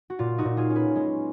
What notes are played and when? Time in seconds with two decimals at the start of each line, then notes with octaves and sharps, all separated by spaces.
0.10 F#4
0.19 A#2 F4
0.38 D#4 F#4
0.45 A#2
0.57 F4 G#4
0.70 C#4
0.75 G#4 B4
0.95 G#3